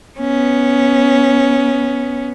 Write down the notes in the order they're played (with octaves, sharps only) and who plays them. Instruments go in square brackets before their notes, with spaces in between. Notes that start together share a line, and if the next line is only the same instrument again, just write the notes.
[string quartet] B3 C#4